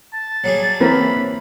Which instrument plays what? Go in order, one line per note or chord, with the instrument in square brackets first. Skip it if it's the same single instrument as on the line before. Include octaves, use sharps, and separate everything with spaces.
[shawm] A5
[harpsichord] F#3 G3 G#4
[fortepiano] E3 A#3 C4 [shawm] B5